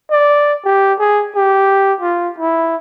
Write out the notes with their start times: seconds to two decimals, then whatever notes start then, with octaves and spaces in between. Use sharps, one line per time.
0.11 D5
0.65 G4
0.99 G#4
1.35 G4
2.01 F4
2.39 E4